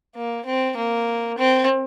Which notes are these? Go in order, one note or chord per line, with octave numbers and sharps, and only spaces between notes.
A#3
C4
A#3
C4